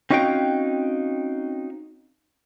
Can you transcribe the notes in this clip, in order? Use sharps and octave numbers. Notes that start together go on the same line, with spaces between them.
C4 C#4 D#4 F#4 F5 G5